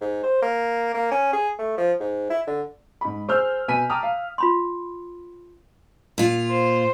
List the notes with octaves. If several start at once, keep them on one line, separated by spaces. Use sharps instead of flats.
G#2
C5
A#3
A#3
C#4
G#4
A3
F3
G#2
E4
D3
G#2 B5
G#4 C5 E6 F6 G6
B2 B4 G#5 B6 D#7
G5 A5 A#5 D6 D#6 F6
F5
F4 B5 C6
A#2 F4
C5